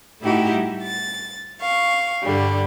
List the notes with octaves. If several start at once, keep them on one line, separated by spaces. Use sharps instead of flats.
A2 A3 D#4 E4 F#4 G4
G3
A6
F5 C#6
G2 D3 G3